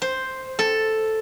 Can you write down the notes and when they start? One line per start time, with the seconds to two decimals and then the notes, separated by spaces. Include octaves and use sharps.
0.02 C5
0.59 A4